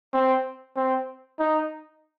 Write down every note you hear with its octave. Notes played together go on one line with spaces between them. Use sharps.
C4
C4
D#4